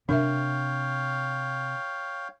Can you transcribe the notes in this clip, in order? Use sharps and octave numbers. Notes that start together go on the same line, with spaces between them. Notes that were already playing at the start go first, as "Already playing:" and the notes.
C3 D4 A#4 C#5 E5 F5 G5